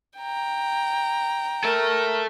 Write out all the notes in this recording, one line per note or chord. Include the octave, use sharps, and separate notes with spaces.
G5 A#5
A4 A#4 E5